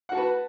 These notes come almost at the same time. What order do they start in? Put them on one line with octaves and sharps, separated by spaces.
F#5 F#4 A5 B4